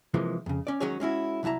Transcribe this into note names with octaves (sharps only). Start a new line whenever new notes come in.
C3 E3 F3 G#3 A#3
F2 C#3
C#4 D5
D#3 F#3 G#3 C#4 G#4 C#5
G#3 C#4 E4 F#4
C2 F#3 E4 A5 A#5